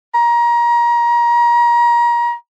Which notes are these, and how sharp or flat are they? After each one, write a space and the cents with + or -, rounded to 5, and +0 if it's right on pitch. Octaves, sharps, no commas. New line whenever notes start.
A#5 +30